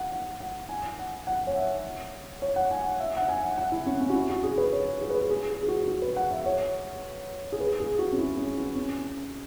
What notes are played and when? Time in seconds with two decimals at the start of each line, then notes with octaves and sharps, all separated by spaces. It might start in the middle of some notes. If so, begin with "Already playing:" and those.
Already playing: F#5
0.12 F#5
0.41 F#5
0.69 G#5
0.99 F#5
1.27 F#5
1.47 C#5
1.56 E5
2.42 C#5
2.56 F#5
2.71 G#5
3.00 E5
3.17 F#5
3.29 G#5
3.57 F#5
3.72 E4
3.86 C#4
4.01 C#4
4.10 F#4
4.15 E4
4.29 F#4
4.43 G#4
4.58 B4
4.73 C#5
5.01 G#4
5.10 B4
5.19 G#4
5.30 G#4
5.50 G#4
5.63 G#4
5.68 F#4
5.88 F#4
6.02 B4
6.16 F#5
6.31 E5
6.46 C#5
7.52 G#4
7.60 B4
7.80 G#4
7.99 F#4
8.12 C#4
8.18 E4
8.37 C#4
8.57 E4
8.75 C#4